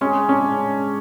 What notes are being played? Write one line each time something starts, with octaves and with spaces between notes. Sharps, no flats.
G#3 C#4
C#4 D4